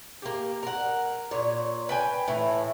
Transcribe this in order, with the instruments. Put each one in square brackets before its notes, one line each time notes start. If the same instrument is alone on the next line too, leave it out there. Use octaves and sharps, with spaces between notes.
[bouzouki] A#3 G4
A#4 F#5
A#2 C#5
B4 G5 G#5
A2 E3